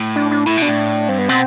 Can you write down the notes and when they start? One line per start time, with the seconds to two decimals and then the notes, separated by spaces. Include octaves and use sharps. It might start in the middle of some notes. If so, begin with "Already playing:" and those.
Already playing: A2
0.16 D4
0.31 D4
0.46 A2 E4
0.57 B2 D4
0.68 A2
1.09 G2 C4
1.19 B3
1.29 B2 C4